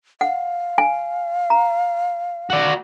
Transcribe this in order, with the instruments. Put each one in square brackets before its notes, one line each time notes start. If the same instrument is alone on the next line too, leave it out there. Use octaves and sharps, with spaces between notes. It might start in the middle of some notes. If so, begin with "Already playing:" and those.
[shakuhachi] F5 [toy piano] F#5
[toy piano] G#5
A#5
[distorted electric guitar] F#4 D5